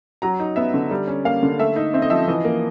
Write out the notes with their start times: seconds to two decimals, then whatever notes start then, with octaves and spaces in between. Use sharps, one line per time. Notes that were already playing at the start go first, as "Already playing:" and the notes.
0.22 F#3 A#5
0.39 D#4
0.56 B3 E5
0.74 D3
0.91 G3
1.07 C#4
1.25 A#3 F5
1.43 D3
1.59 A3 E5
1.76 D#4
1.94 C4 E5
2.02 D#5
2.10 F3 E5
2.28 E3 D#5
2.45 A#3